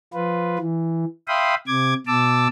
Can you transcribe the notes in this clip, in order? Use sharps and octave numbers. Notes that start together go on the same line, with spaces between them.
F3 F4 B4
E3
E5 F5 G5 B5 C6 D#6
C3 D6 G#6
B2 A5 D6 E6